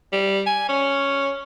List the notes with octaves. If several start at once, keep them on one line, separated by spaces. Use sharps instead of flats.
G3
G#5
C#4